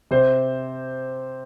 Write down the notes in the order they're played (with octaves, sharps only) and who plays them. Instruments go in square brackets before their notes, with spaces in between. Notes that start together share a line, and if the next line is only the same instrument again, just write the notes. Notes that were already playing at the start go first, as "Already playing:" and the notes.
[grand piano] C3 C5